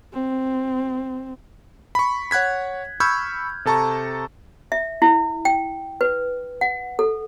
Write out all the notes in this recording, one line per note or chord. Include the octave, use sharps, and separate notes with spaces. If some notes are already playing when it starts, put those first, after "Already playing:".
C4
B5 C#6
C#5 F#5 F#6 G#6 B6
B5 C#6 E6 F6 G6 G#6
C3 A4 A5 A#5 C#6
E5
E4
G5
B4
F#5
A4